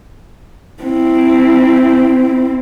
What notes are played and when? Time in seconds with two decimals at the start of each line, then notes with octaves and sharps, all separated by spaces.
0.83 C4 E4